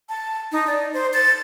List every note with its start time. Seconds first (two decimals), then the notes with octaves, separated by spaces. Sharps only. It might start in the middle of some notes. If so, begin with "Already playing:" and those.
0.09 A5
0.52 D#4
0.67 D5
0.94 C5
1.14 A6